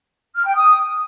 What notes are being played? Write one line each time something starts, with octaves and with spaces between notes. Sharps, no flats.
F6
G5
D#6